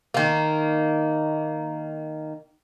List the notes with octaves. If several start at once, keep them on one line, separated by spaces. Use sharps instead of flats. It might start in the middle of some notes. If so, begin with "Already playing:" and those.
D#3 A#3